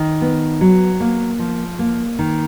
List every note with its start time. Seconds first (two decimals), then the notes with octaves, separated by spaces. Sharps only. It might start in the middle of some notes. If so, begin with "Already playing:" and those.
Already playing: D#3
0.21 B3
0.61 F#3
1.00 A#3
1.39 F3
1.79 A#3
2.19 D#3